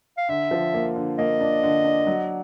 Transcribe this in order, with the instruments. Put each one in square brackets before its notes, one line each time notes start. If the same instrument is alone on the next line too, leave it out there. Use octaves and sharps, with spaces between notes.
[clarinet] F5
[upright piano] D3 [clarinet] E5
[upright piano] F3
A#3
D3
[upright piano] A#3 [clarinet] D#5
[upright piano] D4
D3
D4
F#3